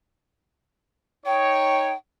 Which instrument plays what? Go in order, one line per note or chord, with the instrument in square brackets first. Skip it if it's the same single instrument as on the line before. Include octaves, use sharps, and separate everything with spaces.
[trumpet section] D#4 C#5 [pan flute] G5